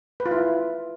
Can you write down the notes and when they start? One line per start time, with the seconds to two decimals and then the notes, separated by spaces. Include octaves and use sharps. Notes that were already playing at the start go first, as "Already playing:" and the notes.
0.20 B4
0.26 F4
0.31 E4